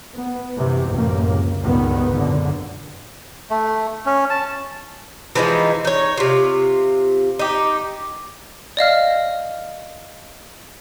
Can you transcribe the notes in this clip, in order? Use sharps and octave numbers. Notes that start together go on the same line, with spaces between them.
B3
F#2 C3 E3
A1 F#2 C3 A#3
C#2
C#2 G2 A#2 D#3 B3
G#1 F#2 A#2 D3
A3
C#4
A5
E3 F3 G#3 D#4
D#4 C#5
C3 F4
D#4 G4
D5 D#5 F5 F6